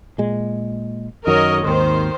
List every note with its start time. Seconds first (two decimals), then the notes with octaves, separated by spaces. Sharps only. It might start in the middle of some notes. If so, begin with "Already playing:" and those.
0.18 A#2 G#3
1.27 F#2 D#3 F#3 A#4 C#5 D#5
1.64 G#1 D#2 D#3 C5